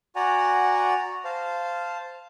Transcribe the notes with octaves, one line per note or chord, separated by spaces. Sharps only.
F#4 D5 F#5 G#5 A#5
C5 F5 A5